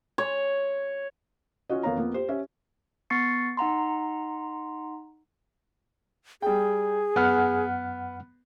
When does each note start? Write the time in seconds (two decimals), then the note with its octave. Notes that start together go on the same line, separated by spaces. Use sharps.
0.18 C#5
1.70 C#4 F4 F#4 D#5
1.83 F2 B3 A#4 C#5 F5 A#5
1.96 F2 A#3 B3
2.14 G4 C5
2.29 C#4 G4 E5
3.10 B3 C#6 A6 C7 C#7
3.57 D#4 F#5 A#5 C6
6.42 G3 G#4 G5
7.16 F#2 B3 F#5 F6